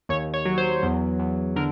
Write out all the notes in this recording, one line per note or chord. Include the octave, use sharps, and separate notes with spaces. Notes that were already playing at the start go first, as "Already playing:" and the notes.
D#2 C#5
C#5
F#3
C5
E2
E2
D3 A#4